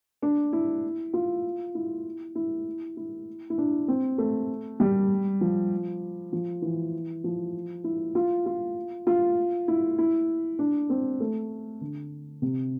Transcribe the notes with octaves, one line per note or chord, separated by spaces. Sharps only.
D4
E4
F4
E4
E4
E4
E4
D4
C4
A3
G3
F3
F3
E3
F3
E4
F4
F4
F4
E4
E4
D4
C4
A3
D3
C3